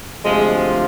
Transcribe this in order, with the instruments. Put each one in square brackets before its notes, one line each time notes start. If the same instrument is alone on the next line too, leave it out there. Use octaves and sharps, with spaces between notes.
[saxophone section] D2 C3 F3 G#3